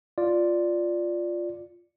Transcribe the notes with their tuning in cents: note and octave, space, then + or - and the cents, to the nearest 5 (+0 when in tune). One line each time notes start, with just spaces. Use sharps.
F4 +0 D5 +0